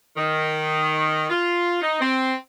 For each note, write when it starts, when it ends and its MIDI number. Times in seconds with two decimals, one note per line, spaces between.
0.17 1.25 51
1.30 1.78 65
1.82 2.01 63
2.01 2.34 60